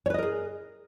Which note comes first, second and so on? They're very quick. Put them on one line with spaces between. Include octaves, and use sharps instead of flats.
C#5 B4 D#5 A#4 G#4